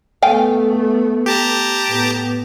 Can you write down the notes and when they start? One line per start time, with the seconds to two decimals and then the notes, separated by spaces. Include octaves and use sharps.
0.23 A3 B3 F5 G5 G#5
1.26 G4 A5 A#5
1.87 A2 B3